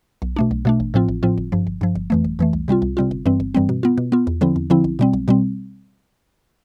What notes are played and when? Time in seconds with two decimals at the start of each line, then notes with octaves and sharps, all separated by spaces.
0.22 B1
0.36 B2 A3 D4
0.51 B1
0.65 B2 A3 D4
0.80 A1
0.94 A2 F3 C4 F4
1.09 A1
1.23 A2 F3 C4 F4
1.38 G1
1.52 G2 F3
1.67 G1
1.81 G2 F3
1.95 G1
2.10 F2 E3 A3
2.24 G1
2.39 F2 E3 A3
2.53 C2
2.68 C3 G3 C4 F4
2.82 C2
2.97 C3 G3 C4 F4
3.11 G1
3.26 G2 E3 G3 C4
3.40 G1
3.54 G2 E3 G3 C4
3.69 B2
3.83 B3 F4
3.98 B2
4.12 B3 F4
4.27 E2
4.41 D3 F3 C4 E4
4.56 E2
4.70 D3 F3 C4 E4
4.84 B1
4.99 B2 G3 C4
5.13 B1
5.28 B2 G3 C4